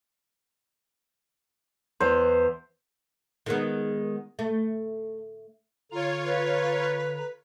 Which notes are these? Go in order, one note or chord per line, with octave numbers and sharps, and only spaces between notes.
E2 C5
D#3 G#3 B3
A3
D3 F4 C#5 A#5
B4